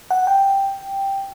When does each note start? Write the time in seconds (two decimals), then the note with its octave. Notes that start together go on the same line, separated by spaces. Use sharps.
0.11 F#5
0.27 G5